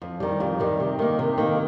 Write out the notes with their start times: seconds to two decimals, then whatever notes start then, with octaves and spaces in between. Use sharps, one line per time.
0.02 F2
0.20 D#3 G3
0.40 F2
0.60 D#3 G3
0.80 C3
0.99 D#3 A#3
1.19 C3
1.38 D#3 A#3